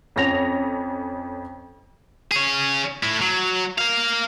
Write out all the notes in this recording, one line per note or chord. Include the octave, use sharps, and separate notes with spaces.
F2 C#4 A#6 F7
G#4 C#5
A2 E4
F#3
A#4 F5